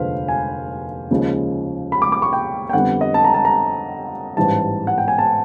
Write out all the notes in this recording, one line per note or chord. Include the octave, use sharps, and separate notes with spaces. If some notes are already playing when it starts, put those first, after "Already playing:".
Already playing: F1 D#2 D3 F3 G#3 B4 C5 F5
G#5
D#2 C#3 F3 G#3
B5
D6
D6
C#6
G5
G5
F2 D3 G3 B3 F#5
D#5
A5
A#5
A5
A#5
A1 G#2 E3 G3 A5
F#5
G5
G#5
A5